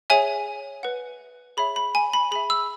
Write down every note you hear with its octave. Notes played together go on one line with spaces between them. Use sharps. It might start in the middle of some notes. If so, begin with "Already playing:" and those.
G#4 C#5 E5 G#5
B4 F#5
G#4 C#5 E5 B5
B5
G#5
B5
G#4 E5 B5
E6